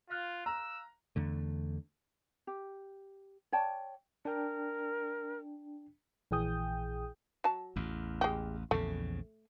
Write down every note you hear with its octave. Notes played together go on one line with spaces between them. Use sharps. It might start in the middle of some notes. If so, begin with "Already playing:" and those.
F4 F5 F6 F#6
A#5 E6
E2 D3 A3
G4
C#5 D5 G5 A5
D4 A#4 G5
A#1 E3 G#4 G5 D#6 G6
F#3 A5
A1 E2
G#3 G4
A#1 E2 C#3 A3